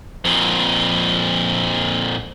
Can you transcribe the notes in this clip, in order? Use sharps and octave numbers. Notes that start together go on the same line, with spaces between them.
F2 A#2